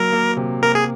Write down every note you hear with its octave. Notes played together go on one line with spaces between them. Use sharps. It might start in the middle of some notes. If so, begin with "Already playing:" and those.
Already playing: F#3 A#3 A#4
A#3
C3
A#3 A#4
G#4